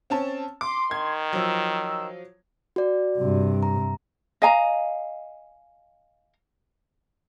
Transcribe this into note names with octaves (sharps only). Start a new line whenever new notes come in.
C4 C#4 A5
C6 D6
D#3 G#6
F3 F#3 E6
F#4 D5
G2 C3
A#5
D#5 F5 G#5 A#5